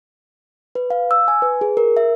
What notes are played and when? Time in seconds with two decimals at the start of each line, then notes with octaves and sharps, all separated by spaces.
0.75 B4
0.90 F5
1.11 E6
1.28 G#5
1.42 B4
1.61 G#4
1.77 A#4
1.97 E5